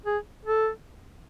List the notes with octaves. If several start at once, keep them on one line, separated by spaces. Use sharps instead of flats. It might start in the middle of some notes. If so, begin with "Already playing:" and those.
G#4
A4